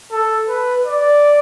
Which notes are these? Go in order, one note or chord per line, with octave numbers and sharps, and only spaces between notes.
A4
B4
D5